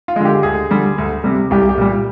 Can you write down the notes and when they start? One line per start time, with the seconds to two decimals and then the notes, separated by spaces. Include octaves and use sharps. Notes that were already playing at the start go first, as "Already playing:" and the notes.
0.08 F4
0.16 D3 G#3
0.25 G4
0.43 D2 G#4
0.71 D3 G3
0.98 D2
1.24 C3 G3
1.51 C2 G4
1.69 G4
1.78 A#2 G3